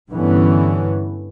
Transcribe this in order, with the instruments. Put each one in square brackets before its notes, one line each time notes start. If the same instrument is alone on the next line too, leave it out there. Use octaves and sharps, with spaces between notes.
[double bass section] G2 D3 E3 B3 C#4